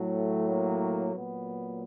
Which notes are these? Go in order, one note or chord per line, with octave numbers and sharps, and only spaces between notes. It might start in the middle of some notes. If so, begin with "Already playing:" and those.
Already playing: A2 F#3 A3
A#3
A#2 F#3 B3